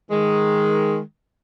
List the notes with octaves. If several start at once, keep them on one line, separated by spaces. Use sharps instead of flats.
D#3 G#3